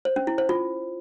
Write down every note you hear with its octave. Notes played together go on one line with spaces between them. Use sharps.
C5
C#4
E4
C5
F4